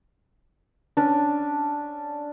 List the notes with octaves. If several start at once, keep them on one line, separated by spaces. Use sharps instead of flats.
C#4 D4